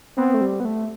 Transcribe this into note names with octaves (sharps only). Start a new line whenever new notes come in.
B3 C4
A3
G3
B3
A3